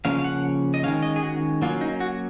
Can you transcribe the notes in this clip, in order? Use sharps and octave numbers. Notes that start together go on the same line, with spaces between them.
C#3 F3 A#3 C#4 F5
F5
F#5
D#5
D#3 G#3 C#4 F5
D#5
G#4
F#4
F#3 A#3 C#4 F4
D#4
F#4